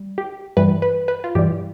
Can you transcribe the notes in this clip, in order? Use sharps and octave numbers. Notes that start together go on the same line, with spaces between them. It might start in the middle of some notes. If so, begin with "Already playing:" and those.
Already playing: G3
G4
G2 E3 G3 B4
B4
B4
F4
G2 E3 G3 G4